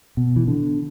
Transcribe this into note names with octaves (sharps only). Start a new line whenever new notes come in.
B2
E3
D3